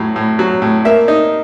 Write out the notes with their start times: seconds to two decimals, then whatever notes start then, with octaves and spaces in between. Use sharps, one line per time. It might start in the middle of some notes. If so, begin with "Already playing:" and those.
Already playing: A2 F#3
0.16 A2
0.39 F#3
0.62 A2
0.85 A#3 E5
1.08 D#4